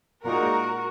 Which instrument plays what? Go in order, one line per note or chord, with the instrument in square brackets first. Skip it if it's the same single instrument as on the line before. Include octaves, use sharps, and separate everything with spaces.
[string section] A#2 G#3 D#4 F#4 A#4